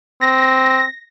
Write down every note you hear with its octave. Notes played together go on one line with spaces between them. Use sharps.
C4 A#6